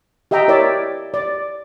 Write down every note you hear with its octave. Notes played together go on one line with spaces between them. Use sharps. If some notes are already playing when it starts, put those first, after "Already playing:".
G4 D#5 E5 G5 A#5
E4 A#4 C#5 D5 E5
D5